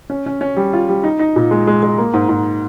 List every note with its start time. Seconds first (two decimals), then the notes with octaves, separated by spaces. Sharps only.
0.10 C#4
0.26 C#4
0.41 C#4
0.57 G3
0.73 F4
0.89 G3
1.04 D#4
1.19 D#4
1.36 A#2
1.51 G#3
1.67 G#3
1.83 G#3
1.98 A#3
2.13 G#2
2.29 G#2